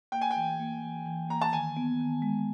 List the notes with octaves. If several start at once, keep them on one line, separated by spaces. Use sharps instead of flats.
A#3 G5
G#5
G5
E3
A#3
E3
E3
A#3 A#5
A5
D#3 G#5
B3
D#3
G#3